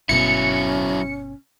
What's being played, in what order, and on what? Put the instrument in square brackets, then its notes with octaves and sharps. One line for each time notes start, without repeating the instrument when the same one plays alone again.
[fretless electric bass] G1 B2 [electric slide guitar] F#3 E4 [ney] C#4 [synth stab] C#7